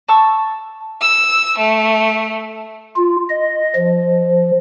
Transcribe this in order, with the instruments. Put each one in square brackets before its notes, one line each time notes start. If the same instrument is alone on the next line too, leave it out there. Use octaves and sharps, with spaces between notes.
[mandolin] A5 C#6 E6
[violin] E6
A3
[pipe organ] F4
D#5
F3